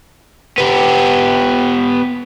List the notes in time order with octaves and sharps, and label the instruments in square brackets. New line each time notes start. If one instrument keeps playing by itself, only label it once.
[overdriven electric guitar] B3 G4